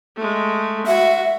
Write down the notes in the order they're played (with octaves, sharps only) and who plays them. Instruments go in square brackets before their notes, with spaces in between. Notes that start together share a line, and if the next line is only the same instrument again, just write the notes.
[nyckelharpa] G#3 A3
[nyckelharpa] F#4 [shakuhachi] E5